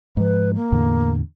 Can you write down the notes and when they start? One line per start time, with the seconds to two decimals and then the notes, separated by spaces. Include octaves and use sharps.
0.17 G#2 F3 B4
0.55 A#3
0.72 E2 A2 D3